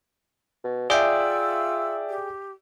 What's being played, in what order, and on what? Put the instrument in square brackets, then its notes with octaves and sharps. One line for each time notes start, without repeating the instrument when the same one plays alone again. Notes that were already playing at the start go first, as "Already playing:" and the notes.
[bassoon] B2
[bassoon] F4 [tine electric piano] G#4 G5 [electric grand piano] D5 E5 [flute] E6
[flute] G4